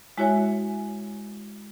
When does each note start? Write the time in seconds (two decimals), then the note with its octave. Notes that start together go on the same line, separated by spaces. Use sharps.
0.18 G#3 E4 F#4 C#5 E5 G#5